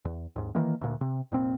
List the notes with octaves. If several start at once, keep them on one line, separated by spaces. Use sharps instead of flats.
E2
D#2 G#2
D#3 E3 G#3 A#3
D2 A#2
C3
F1 A#2 C4